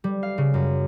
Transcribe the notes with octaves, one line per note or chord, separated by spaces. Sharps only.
G3
F5
C#3
F#2